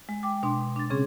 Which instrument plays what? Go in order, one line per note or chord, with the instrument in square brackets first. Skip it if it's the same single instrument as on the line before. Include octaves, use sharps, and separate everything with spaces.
[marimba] G#3
G5 D6
B2 D4 C6
D4 A6
C#3 C4 C#4 G#4